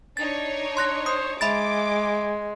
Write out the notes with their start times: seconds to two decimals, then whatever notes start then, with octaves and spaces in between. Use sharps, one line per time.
0.17 D4 D#4 C#5 A6
0.77 C6 F#6 A#6
1.06 C5 D#6
1.41 G#3 E5 B5 D6 A6